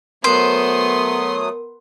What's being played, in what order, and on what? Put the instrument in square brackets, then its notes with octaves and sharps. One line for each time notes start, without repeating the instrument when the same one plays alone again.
[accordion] F#3 A3 D#6 [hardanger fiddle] B3 C6 [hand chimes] A#4 [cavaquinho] C5